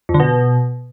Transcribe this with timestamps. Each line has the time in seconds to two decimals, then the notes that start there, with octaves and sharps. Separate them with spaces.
0.09 F2
0.14 D3
0.20 B2